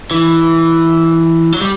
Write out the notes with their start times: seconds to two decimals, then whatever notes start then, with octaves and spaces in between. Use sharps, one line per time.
0.11 E3
1.52 F#3
1.62 G3